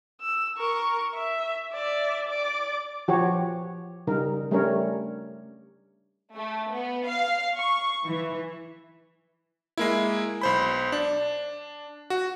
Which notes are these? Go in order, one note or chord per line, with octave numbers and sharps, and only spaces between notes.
E6
A#4 C#6
E5
D5 E5
D5 D6
F3 F#4 G4 C#5
C#3 G3 D#4 A#4
G3 A3 C#4 D4 A#4 C#5
A3
B3
F5
C#6
E3
G#3 A#3 E4
B1 C5 B5
D4
F#4